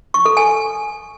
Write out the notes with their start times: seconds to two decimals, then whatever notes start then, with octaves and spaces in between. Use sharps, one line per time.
0.14 C#6
0.25 A4
0.37 G#5